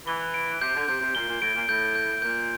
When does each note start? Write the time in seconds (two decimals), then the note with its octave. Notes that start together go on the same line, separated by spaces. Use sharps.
0.07 E3 G7
0.34 D7
0.61 C3 G6
0.75 D3
0.88 C3 G6
1.01 C3
1.15 A#2 G7
1.28 A#2
1.41 A2 D7
1.55 A#2
1.68 A2 G6
1.95 G6
2.22 A#2 G6